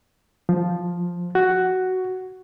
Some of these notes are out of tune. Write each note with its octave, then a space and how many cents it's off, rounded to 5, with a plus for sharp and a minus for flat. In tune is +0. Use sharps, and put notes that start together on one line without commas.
F3 +5
F#4 +5